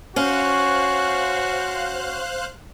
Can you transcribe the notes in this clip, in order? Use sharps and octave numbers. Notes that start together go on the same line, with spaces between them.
C#4 F#4 C5 F5 F#6